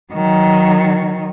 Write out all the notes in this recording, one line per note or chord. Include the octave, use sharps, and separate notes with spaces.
D#3 F#3